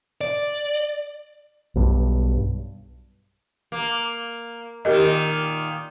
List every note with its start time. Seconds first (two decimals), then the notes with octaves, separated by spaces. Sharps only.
0.21 D5
1.75 B1 G2
3.72 A#3
4.85 A#2 D#3 G4 A#4 D#5